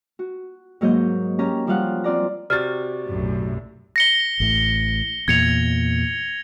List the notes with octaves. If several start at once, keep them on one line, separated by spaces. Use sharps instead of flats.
F#4
G#2 F#3 A#3 D#5 G6
C#4 G4 A#5
F3 G3 C#4 F5 F#5
C4 F4 D5 A#5
C3 F#4 D5 F6 A6
B1 F#2 A2
A#6 C#7 G7
A1 A2
E2 A#2 G#6 C#7 F7